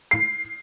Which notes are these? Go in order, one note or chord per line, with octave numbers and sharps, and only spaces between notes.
C7